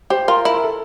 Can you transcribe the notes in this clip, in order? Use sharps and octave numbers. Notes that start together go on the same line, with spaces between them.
G4 C5
F4 A#4
E4 A#4
A#4
A4